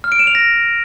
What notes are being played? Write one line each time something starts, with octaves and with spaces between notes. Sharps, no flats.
F6
D7
E7
F7
A#6